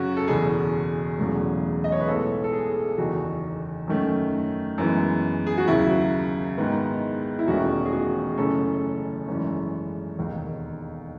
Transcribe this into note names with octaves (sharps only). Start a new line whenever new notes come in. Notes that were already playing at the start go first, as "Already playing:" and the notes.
Already playing: F#2 C#3 F#3 C#4 F#4
A4
F#1 E2 B2 G#4
E1 E2 C#3 F#3 A3
D#5
C#5
B4
B1 A2 G#3 B3 A4
A4
G#4
F#1 E2 D#3 F#4
F#2 D#3 A3 C#4
F#2 E3 G#3 B3
G#4
F#4
D#2 C#3 F#3 E4
G#2 D#3 G#3 B3
E4
E1 E2 D#3 A3 C#4 F#4
G#4
F#4
F#1 F#2 E3 A3 C#4 A4
G#1 F#2 E3 G#3 C#4
E1 D#2 D#3